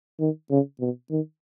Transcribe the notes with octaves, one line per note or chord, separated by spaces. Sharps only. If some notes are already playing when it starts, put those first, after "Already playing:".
D#3
C#3
B2
D#3